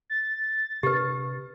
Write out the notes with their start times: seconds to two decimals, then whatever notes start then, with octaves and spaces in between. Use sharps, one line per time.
0.10 A6
0.83 C3 D4 G4 B4